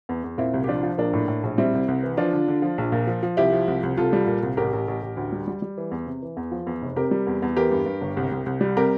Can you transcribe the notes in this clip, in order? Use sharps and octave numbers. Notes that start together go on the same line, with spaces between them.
E2
E2
A#2 C4 E4
C2
G4
F3 D4 F4
F3
A#1 A#3 D4
A2
A2
A#1
G3 C4 E4
C2
C2
E3
F3 D4 F4
D3
D3
F3
A#1
A#2
F3
F3
C2 E4 G4
F3
C2
C2
C2 F4 A4
G3
A#2
C2
A1 G4 A#4
A1
A1
A1
D2
G3
G3
G3
E3
E2
C3
E3
E2
F3
E2
F1
C3 G4 A#4
G3
E2
E2
E3 G4 A#4
G2
G2
G1
C2
C2
C2
G3
C3 G4 A#4